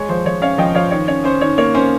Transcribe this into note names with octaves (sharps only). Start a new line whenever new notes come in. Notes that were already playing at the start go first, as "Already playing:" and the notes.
Already playing: G#3 C#5
F3 C5
F3 C#5
C#4 C#5 F5
F3 D#5 G5
F3 C#5 F5
D#3 C#5
C#4 C#5
C#4 C5
D#3 C#5
A#3 C#5
C#4 C5